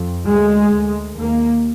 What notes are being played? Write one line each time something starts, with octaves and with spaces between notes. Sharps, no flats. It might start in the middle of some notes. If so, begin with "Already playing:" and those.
Already playing: F2
D2 G#3
D2
D#2 A#3